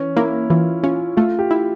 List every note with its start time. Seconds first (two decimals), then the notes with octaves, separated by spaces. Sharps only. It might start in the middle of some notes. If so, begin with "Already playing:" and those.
Already playing: E3 C#4
0.16 A#3 E4
0.50 E3 F4
0.83 C#4 F4
1.17 A3 F4
1.39 G4
1.51 E4